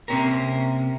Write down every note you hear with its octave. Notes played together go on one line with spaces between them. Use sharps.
C3 A#3 C4 C#4 G4 A#4